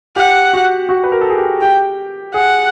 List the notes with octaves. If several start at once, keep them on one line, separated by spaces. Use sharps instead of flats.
G4 F#5
F#4
F#4
B4
A#4
A4
G#4
G4
G4 G5
G#4 F#5